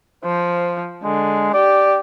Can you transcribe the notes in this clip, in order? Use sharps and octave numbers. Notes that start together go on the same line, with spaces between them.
F3 C5
D3 G#3
G4 D5